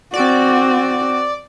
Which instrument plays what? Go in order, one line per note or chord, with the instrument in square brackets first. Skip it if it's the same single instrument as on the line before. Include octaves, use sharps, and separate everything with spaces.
[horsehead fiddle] C4 F#4 [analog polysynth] D5